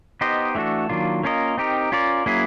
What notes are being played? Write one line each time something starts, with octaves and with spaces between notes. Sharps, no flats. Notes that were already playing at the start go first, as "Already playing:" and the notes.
B3 D#4 G4 C5 D#5
E3 A3 D4 F#4 A4
D#3 F#3 A#3 D4 F4
A#3 C#4 F4 A#4 D#5
C4 D#4 G4 A#4
C#4 F4 A#4 D5
F#3 A#3 C#4 E4 G#4